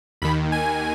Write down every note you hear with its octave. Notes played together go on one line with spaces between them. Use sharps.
D#2 D#3 B5
G#5